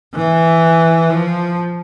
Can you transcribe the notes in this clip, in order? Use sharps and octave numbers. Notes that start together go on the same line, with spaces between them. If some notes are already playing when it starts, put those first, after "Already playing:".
E3
F3